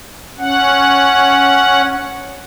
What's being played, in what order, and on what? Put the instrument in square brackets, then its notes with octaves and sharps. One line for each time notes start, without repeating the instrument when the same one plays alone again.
[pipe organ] C#4 F#5